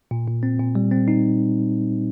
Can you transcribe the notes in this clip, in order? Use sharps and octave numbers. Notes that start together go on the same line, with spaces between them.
A#2
A#2
C4
A#2
G3
C4
D#4